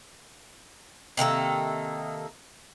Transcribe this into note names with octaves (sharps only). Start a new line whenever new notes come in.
C3 D#3 A#3 A4